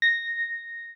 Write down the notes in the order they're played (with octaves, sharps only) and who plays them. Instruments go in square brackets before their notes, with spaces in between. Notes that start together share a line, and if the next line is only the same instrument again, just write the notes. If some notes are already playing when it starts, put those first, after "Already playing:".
[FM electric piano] A#6